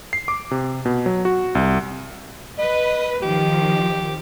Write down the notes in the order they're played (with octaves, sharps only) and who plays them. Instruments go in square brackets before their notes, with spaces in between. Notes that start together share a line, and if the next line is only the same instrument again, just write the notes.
[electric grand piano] C7
D6
C3
B2
F#3
F#4
C2
[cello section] B4 [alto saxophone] D#5
[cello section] D#3 F3 [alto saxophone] G4